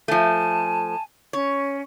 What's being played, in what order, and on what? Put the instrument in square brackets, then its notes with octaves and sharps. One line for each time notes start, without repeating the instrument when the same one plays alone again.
[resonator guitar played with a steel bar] F3 A3 [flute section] G#5 A5
[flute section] C#4 [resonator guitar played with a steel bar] C#5